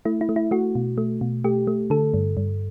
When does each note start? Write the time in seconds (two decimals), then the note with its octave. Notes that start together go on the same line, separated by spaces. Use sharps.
0.05 A3 E4
0.21 E4
0.29 A3
0.36 E4
0.51 A3 F#4
0.75 B2
0.98 A3
1.21 B2
1.44 A3 G4
1.67 A3
1.90 D3 A4
2.14 G2
2.37 G2